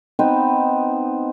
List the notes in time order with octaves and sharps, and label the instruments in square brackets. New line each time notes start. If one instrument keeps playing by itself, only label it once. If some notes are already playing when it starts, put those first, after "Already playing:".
[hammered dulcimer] B3 C4 D#4 B4